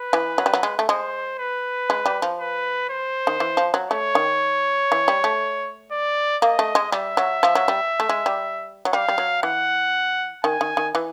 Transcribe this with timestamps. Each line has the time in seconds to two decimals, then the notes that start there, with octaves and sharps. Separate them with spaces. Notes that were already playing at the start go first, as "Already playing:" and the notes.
Already playing: B4
0.13 E3
0.38 F#3
0.46 G3
0.54 F#3
0.63 G#3
0.79 A3
0.89 G#3 C5
1.39 B4
1.90 G#3
2.06 G3
2.22 F3
2.40 B4
2.90 C5
3.27 D#3
3.40 E3
3.57 F3
3.74 F#3
3.90 A3 C#5
4.15 D#3
4.92 E3
5.08 G3
5.24 A3
5.92 D5
6.42 A#3 D#5
6.59 A3
6.75 G#3
6.92 G3 E5
7.17 F#3
7.43 F3
7.55 F#3
7.68 G3
8.00 A3
8.09 G#3
8.26 G3
8.85 F#3
8.93 G3 F5
9.08 G3
9.18 F#3
9.43 E3 F#5
10.44 D#3 G#5
10.61 D#3
10.77 D#3
10.95 E3